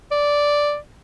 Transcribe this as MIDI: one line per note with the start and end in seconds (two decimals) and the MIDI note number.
0.11 0.77 74